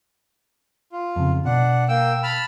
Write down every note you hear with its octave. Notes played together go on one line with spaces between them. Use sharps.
F4
F2 C#3
B2 D4 F#5
A#3 G5 E6
A5 B5 F6